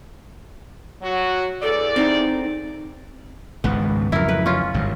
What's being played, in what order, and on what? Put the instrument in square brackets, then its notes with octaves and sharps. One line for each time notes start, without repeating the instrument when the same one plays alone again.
[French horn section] F#3 F#4
[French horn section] E2 D5 [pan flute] A4
[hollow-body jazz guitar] C4 [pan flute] D#4
[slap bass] G#1 C#2 G#2 [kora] B3
[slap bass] F2 C#3 F#3 [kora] E4 A#4
[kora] B4
C#4 F4
[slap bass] G#1 G2